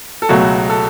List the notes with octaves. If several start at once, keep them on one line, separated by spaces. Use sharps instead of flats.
A4
C#2 B2 F#3 A3 F#4
A4